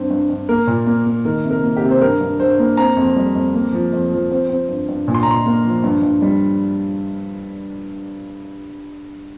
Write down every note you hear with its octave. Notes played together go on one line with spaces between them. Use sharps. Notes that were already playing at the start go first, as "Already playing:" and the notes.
Already playing: G2 C4
G2
G2
A#3 A#4
A#2
A#3
A#3
D#3 A#4
C3
A#4
A#3
G4
C3
C5
G2 A#4
G2
G2 C5
A#3
C4 A#5
F2
G3
F2
A#3
F3
F2
F3
C4
C4
G2
G2
A#2
C6
A#5
A#2 C6
A#3
F3
G2
G2
G3